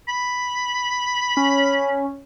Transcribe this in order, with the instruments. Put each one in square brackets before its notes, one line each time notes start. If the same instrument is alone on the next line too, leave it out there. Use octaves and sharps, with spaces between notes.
[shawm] B5
[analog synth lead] C#4